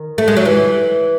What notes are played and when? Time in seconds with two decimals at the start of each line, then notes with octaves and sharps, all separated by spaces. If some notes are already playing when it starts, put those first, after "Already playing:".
Already playing: D#3
0.18 A3
0.28 G#3
0.37 F#3
0.45 E3